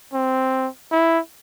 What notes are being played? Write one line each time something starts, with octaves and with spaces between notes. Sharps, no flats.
C4
E4